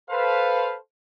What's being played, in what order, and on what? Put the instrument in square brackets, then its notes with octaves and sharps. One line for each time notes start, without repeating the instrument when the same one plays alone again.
[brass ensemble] A4 B4 C5 F5